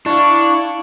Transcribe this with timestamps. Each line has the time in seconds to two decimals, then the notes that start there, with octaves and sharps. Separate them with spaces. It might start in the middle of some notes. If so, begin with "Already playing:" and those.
0.06 D4 E4 F5 A5 C#6